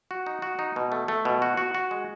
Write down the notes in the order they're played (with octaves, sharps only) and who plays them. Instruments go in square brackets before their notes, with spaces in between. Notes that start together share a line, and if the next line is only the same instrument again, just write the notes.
[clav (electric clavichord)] F#4
D#4
F#4
D#4
B2
A3
A3
B2
F#4
F#4
F#4
G#3